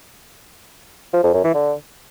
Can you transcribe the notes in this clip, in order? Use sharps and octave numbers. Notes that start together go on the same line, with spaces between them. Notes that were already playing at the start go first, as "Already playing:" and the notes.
F3
F2
F#2
E3
D3